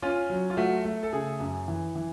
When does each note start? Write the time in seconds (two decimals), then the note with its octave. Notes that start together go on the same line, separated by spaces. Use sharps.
0.02 C#4 F4
0.30 F#3
0.50 F4
0.57 A3 F#4
0.85 A3
1.03 A4
1.13 C#3 G#4
1.40 F#2
1.68 E3
1.95 E3